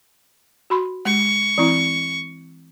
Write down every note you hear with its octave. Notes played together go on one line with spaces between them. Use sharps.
F#4 B5 C6
G#3 C#6
E3 C4 E4